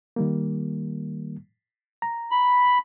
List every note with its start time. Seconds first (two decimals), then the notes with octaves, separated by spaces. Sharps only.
0.16 D#3 G3 A#3
2.02 A#5
2.31 B5